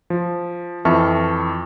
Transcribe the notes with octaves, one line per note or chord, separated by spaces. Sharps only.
F3
F2 E3 E5 A5 C#6 F6